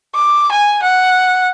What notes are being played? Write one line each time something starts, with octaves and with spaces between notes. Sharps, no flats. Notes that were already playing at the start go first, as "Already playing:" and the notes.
D6
G#5
F#5